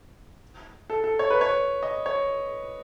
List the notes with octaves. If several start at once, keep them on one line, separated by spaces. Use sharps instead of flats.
A4
A4
C#5
B4
C#5
D#5
C#5